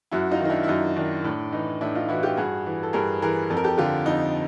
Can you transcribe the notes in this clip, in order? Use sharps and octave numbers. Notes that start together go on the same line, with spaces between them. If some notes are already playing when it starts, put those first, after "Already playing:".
F#2 E4 F#4
D#4 F4
D#3
D#4
D4 E4
E4
F#2 D#4
D#3 D4
A2 D4
E3 D#4
A2 D4 E4
D#4 F4
E3 E4 F#4
F4 G4
G2 F#4 G#4
E3
A4
G2 G#4 A#4
E3 G#4 A#4
F2 A4
A#4
G4 A4
D3 F4 G4
F2 D#4